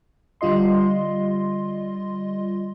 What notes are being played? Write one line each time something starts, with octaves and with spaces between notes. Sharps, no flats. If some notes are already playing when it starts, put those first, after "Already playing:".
D3 G3 F4 D#5 C6